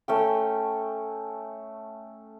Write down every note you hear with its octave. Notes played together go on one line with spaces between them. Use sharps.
A3 C#4 G5